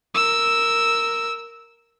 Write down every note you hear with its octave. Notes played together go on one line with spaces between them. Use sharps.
A#4 E6